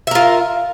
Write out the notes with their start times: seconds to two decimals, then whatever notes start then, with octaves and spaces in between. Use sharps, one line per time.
0.07 E5
0.11 A#4
0.15 F4